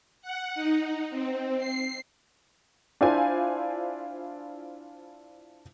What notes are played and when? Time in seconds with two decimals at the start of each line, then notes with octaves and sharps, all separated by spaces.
0.22 F#5
0.55 D#4
1.10 C4
1.58 C7
3.01 D4 E4 F4 C5 G#5